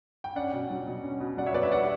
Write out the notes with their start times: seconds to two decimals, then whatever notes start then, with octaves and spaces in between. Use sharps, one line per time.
0.24 G5
0.35 C#4 D5 F#5
0.53 B2
0.70 F#3
0.87 B2
1.03 C#4
1.20 B2
1.37 F#3 D5 F#5
1.46 C#5 E5
1.54 B2 B4 D5
1.63 C#5 E5
1.71 G3 D5 F#5